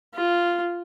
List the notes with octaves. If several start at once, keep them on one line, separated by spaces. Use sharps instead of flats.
F4